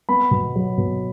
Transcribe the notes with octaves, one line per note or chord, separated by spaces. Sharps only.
B3 B5
B2
F#3
B2